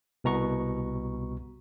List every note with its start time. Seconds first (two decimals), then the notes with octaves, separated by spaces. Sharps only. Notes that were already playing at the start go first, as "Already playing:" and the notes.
0.24 C2 B2 A#5 C#6